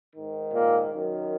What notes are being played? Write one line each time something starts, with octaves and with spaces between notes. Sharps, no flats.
G#2 D#3
A#2 A#3
F#2 D#3